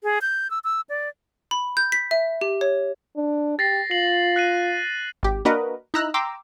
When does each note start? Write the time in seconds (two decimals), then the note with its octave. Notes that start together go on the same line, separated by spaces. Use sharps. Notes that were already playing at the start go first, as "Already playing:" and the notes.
0.04 G#4
0.22 G6
0.50 E6
0.64 E6
0.89 D5
1.51 B5
1.77 G6
1.92 B6
2.11 E5
2.41 G4
2.61 C#5
3.16 D4
3.59 G4 A6 A#6 C7
3.91 F4 C7 F#7
4.36 F#6 C7 D#7
5.23 G#1 G4
5.45 A#3 D4 F#4 A#4 B4 D#5
5.94 D#4 E4 A#5 E6 F#6
6.14 G5 A#5 C6 D6 E6